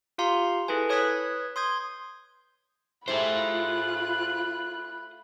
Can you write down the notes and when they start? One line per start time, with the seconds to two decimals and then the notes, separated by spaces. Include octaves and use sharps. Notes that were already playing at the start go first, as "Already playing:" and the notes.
0.18 F4 G4 F5 A#5 C6
0.68 E4 G#4 A4 B4 G#5
0.89 B4 C#5 D#6 F#6 G#6 B6
1.56 C6 D#6 G6 G#6
3.08 A3 E4 F4 G4 G#4 C5 B5 F#6